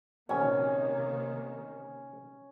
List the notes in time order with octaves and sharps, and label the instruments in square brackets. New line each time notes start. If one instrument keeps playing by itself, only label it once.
[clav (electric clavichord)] A#1 F#4 G#5 [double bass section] C3 D#3 A#3 [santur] C#4